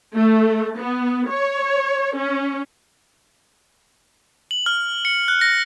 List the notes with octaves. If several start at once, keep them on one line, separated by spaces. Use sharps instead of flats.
A3
B3
C#5
C#4
F#7
F6
C#7
F#6
A#6